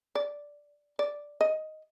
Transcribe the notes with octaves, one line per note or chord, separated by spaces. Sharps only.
D5
D5
D#5